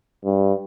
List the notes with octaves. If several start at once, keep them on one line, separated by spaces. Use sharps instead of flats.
G2